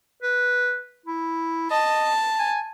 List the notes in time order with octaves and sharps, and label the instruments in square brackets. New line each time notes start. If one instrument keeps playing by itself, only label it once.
[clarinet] B4
E4
[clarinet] D#5 [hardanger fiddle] A5
[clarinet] G#5